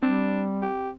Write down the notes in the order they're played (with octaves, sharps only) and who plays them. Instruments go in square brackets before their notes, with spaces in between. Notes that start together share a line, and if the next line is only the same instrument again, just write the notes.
[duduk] G3 [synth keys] C4 [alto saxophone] D4
[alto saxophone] G4